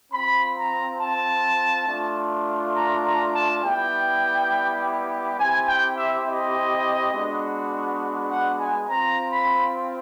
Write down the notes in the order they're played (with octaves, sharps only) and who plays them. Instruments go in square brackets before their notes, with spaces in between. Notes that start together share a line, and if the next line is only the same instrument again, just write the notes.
[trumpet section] C4 F4 B5
A#5
A5
A3 D4 F4
A#5
A#5
A5
G3 B3 E4 G4 G5
C4 E4 G4 G#5
G5
E5
D#5
G#3 B3 D4 F#4
F#5
G#5
C4 F4 A#5
B5